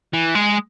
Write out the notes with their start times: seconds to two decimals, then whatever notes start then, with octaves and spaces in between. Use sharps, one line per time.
0.13 E3
0.35 G#3